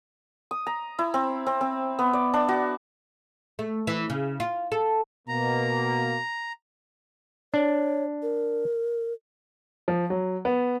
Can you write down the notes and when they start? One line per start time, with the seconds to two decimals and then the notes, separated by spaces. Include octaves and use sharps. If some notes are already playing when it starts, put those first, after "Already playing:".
0.51 D#6
0.67 A#5
0.99 E4
1.14 C4
1.47 C4
1.61 C4
1.99 B3
2.13 D5
2.34 D4
2.48 F#4
3.59 A3
3.87 E3
4.10 C#3
4.40 F4
4.72 A4
5.28 B2 A#3 A#5
7.54 D4 C#5
8.22 A#4
9.88 F3
10.10 F#3
10.45 B3